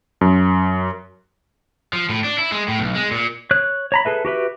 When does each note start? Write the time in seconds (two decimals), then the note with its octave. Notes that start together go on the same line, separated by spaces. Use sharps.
0.21 F#2
1.93 F3
2.09 A2
2.24 D4
2.38 E4
2.52 G#3
2.68 A2
2.79 B1
2.95 G#3
3.11 A#2
3.51 C#5 F#6
3.92 C#5 A#5 B5
4.05 G#4 A4 B4 E5
4.25 F#4 G4 B4 E5